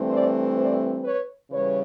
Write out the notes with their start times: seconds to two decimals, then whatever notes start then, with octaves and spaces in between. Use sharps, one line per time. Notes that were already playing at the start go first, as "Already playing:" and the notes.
Already playing: G2 E3 A3 C4
0.09 C5 D5
0.57 C5 D5
1.04 B4 C#5
1.51 C#3 E3 G3 B4 C#5